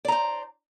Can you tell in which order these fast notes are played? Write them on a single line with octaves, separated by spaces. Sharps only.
D5 A#5 C5